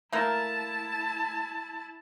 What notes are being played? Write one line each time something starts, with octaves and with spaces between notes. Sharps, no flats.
A3 A#3 E4 A#4 A5